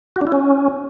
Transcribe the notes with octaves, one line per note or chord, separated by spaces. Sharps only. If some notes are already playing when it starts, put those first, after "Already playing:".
F#4
D4
E4
C#4